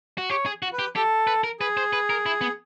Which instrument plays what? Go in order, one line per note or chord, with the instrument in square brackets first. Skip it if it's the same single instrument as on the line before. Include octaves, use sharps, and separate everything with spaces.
[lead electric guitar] F#4
[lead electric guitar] G4 [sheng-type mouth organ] C#5
[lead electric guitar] G#4
F#4
[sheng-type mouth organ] B4
[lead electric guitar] G4
[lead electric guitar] G4 [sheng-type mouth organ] A4
[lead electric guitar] B4
A#4
[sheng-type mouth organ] G#4 [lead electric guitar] B4
[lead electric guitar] C5
B4
A#4
E4
B3